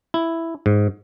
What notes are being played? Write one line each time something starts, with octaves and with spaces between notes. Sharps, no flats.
E4
G#2